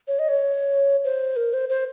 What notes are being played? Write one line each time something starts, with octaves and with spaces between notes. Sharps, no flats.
C#5
D#5
C#5
C5
A#4
C5
C5